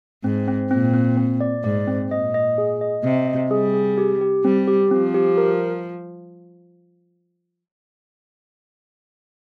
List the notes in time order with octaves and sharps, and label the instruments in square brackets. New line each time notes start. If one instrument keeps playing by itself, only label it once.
[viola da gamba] G#2 [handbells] C4
[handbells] C4
[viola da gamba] A#2 [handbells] C4
[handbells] C4
C4
D5
[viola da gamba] G#2 [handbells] D5
[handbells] C4
[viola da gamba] A#2 [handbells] D#5
[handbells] D#5
G#4
D#5
[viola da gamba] C3 [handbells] D#5
[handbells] D#5
[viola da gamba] G3 [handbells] G#4
[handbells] G#4
G4
G4
[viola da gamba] G3 [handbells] C4
[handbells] G4
[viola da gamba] F3 [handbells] C4
[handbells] G4
A#4